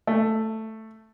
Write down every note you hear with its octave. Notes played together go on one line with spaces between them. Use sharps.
A3